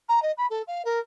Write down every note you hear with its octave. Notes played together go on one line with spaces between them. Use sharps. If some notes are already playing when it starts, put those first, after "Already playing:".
A#5
D#5
B5
A4
F5
A#4